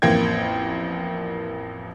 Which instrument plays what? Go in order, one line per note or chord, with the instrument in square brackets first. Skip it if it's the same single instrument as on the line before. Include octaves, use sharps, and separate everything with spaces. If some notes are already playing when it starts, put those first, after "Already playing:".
[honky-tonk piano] A1 F2 A#3 G5 G#6